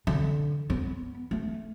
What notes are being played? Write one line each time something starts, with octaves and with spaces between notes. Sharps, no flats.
D3
B3
A3